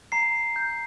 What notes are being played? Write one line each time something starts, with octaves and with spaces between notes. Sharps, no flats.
A#5 C7
G6